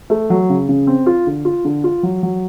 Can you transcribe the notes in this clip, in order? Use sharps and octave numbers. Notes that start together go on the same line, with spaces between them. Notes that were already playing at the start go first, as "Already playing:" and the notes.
A3
F#3
C#3
C#3
C4
F4
D3
F4
D3
F4
F#3
F#3